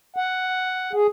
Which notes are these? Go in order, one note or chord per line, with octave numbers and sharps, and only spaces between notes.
F#5
G#4